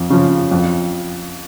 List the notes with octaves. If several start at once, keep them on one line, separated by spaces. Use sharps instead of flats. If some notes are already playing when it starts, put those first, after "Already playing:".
Already playing: F2
C#3 F3
F2